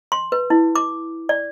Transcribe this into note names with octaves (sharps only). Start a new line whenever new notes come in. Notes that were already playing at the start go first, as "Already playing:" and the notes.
C6
B4
E4
D6
D5